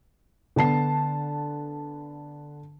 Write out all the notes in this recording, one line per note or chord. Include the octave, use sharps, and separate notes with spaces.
D3 B3 A5 C7